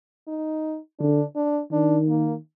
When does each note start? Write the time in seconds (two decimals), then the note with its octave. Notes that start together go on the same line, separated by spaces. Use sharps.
0.28 D#4
0.99 D3 D4
1.36 D4
1.72 D#3 D4
2.09 A#3